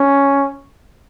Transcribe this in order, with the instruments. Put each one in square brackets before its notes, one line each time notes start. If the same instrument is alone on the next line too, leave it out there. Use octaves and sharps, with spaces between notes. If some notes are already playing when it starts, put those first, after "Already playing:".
Already playing: [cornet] C#4